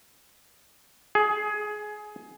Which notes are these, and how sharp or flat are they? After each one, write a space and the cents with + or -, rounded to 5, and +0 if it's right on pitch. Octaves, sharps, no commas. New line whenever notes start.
G#4 +20